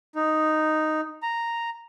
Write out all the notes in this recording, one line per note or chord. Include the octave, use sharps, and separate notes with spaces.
D#4
A#5